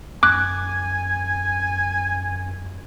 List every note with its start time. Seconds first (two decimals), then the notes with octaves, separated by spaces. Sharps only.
0.23 F#2 G#5 D6 F#6